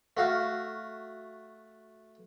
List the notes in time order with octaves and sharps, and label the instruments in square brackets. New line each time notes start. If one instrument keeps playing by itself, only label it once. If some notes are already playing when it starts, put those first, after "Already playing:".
[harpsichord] A3 F#4 F5